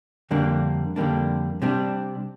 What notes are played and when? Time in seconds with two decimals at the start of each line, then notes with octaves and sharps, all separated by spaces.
0.31 F2 D3 G3 A#3 D4
0.96 F2 D3 G3 A#3 D4
1.62 C3 G3 D4